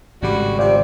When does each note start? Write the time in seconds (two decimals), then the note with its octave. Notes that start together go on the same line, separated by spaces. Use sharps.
0.22 G#1 A2 C#3 G3 F#4
0.59 C3 F3 D5